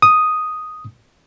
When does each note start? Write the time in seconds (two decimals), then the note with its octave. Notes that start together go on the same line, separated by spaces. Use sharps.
0.02 D#6